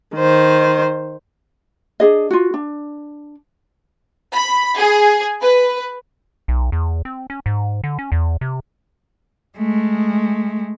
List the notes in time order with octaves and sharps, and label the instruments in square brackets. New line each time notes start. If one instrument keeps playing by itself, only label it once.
[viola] D#3 C5
[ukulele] D4 G#4 D#5
F4 F#4
D4
[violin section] B5
G#4
B4
[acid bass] B1
E2
C4
C#4
G#2
D3
C#4
E2
C3
[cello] G#3 A3